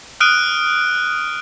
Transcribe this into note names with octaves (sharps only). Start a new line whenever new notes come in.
D#6 F6 F#6 D7 D#7